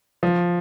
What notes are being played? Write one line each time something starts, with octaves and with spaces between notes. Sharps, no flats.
F3